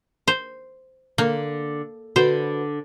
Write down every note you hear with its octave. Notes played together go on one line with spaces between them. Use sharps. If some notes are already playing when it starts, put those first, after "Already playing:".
C5
D3 A#3
D3 F#4 B4 C5